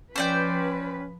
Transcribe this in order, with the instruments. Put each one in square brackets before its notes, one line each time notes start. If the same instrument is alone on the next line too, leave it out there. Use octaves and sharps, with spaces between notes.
[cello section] F3 B4 [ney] C#4 [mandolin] C5 D5 G5